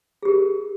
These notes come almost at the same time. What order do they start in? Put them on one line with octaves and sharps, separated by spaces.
G#4 G4 A#4